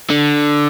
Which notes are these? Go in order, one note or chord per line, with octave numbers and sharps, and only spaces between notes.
D3